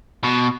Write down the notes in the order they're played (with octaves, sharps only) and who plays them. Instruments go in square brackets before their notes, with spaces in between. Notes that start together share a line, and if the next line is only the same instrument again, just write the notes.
[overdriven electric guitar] B2